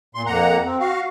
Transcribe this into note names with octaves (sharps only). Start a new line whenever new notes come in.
A#2 C6
F2 A#3 F#5 A#5
C4
F#4 F5